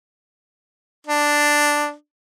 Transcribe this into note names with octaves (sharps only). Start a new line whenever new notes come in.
D4